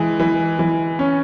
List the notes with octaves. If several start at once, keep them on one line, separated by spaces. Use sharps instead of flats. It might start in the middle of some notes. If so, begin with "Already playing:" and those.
Already playing: E3 G#3
E3
E3
C#4